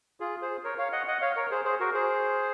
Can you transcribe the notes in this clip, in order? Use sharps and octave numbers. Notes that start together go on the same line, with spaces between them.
F4 G#4
G#4 C5
A#4 C#5
C#5 F5
D#5 F#5
D#5 F#5
C#5 F5
A#4 C#5
G#4 C5
G#4 C5
F#4 A#4
G#4 C5